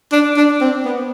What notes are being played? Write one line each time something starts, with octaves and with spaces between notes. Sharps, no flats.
D4
D4
C4
B3